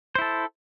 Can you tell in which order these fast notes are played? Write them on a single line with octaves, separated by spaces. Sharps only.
C5 E4 A4